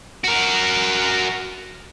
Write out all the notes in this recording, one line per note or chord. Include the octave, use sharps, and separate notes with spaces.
F#4 A#4